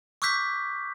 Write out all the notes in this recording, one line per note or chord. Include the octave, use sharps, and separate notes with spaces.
C#6 D6 E6 F#6 G6 B6